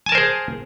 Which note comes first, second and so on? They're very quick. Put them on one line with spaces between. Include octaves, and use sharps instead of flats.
G#5 A5 A#4 C5 G#4